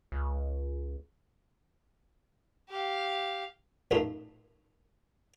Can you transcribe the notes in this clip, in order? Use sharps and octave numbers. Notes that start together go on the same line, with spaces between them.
C#2
G4 F5
A1 F#2 A#2 A3 D#4 C6